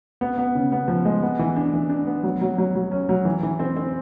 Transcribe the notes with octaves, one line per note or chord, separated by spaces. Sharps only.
B3
B3
C#3
B3
F3
G#3
B3
E3
D4
E3
D4
B3
F#3
F#3
F#3
F#3
C#4
F#3
E3
E3
C4
C4